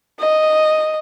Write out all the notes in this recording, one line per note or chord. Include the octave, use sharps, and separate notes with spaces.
D#5